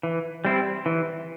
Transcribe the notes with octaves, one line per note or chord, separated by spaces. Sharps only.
E3
G3 C4 E4
E3